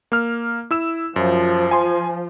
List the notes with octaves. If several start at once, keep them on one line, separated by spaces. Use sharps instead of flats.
A#3 F6
E4 E6 E7
F#2 F3
G#5 C6